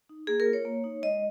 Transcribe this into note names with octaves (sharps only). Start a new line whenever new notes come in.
D#4
A#3 G#4
A#4
F4
C#5
A#3
D#4
G#3 D#5